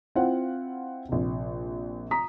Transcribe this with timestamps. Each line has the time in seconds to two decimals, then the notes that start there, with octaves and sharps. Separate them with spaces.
0.15 C4 E4 F4 C5 F5 F#5
1.09 A#1 C3
2.11 A#5 D#6 B6